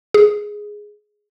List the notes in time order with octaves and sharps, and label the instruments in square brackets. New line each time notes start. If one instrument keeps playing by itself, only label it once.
[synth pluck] G#4